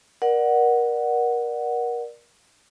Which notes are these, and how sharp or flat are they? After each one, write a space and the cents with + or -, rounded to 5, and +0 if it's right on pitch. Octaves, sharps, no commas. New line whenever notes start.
A#4 +30 D5 +15 F#5 +0